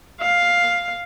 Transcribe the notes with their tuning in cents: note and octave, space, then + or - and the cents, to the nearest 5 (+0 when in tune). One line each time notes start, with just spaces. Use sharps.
F5 +5